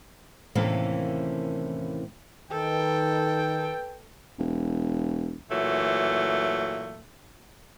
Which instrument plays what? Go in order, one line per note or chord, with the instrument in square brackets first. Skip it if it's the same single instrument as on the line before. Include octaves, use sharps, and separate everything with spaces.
[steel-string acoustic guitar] D#2 A2 C3 E3 A#3 C#4
[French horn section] D#3 [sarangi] A4 [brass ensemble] B4 G5
[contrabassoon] E1
[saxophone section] A#2 E3 F#3 A3